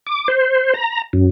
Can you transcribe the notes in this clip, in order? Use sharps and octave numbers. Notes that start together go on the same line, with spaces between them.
D6
C5
A#5
F#2